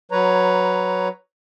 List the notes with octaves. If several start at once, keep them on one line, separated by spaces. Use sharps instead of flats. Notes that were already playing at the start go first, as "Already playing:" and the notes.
F#3 B4 C#5 A#5